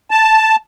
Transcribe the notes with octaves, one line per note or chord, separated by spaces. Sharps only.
A5